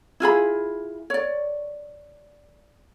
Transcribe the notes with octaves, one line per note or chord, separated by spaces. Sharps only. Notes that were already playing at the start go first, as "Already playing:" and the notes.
E4 F4 G#4 B5
C#5 D5